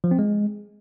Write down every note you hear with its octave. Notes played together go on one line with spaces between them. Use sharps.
F3
C4
G#3